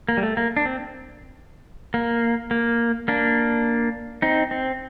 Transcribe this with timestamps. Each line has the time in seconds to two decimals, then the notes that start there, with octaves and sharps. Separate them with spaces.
0.09 A#3
0.17 G3
0.23 A3
0.37 A#3
0.57 D4
0.65 C4
1.94 A#3
2.51 A#3
3.08 A#3 D4
4.22 C4 D#4
4.51 C4